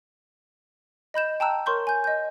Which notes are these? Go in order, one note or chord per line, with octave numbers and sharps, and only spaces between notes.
D#5 B5 G6 E7
G5 A5 A#5 E6 F#6
A#4 C#5 C6 C#6 G6
G#5 G6
D#5 G6